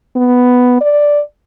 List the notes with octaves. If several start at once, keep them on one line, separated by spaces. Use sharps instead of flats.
B3
D5